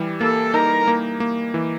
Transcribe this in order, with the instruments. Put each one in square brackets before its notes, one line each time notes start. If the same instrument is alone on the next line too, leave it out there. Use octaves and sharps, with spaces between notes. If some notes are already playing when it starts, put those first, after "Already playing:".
Already playing: [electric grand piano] E3 G3
[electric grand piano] A#3 [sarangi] A4
[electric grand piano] D#4 [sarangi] A#4
[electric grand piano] A#3
A#3
E3